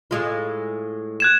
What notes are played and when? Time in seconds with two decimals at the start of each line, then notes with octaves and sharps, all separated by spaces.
0.11 A2 G#3 F4
1.20 F#6 G#6 E7